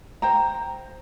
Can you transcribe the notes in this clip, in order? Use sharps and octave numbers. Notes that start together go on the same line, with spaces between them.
C5 G5 A#5